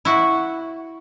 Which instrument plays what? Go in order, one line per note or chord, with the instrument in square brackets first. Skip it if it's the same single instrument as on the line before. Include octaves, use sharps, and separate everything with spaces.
[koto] E4 F#4